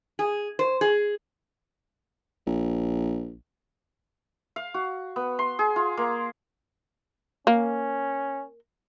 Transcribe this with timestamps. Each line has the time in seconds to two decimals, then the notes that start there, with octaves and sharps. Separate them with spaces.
0.19 G#4
0.59 C5
0.81 G#4
2.46 A#1
4.56 F5
4.74 F#4
5.16 B3
5.39 C6
5.59 G#4
5.76 F4
5.97 A#3
7.47 A#3 C#4